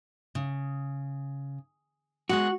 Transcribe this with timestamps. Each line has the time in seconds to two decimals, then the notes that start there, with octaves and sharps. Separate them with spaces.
0.35 C#3
2.29 G#3 B3 F#4 G#4